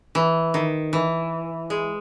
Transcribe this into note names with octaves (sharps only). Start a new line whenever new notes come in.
E3
D#3
E3
G#3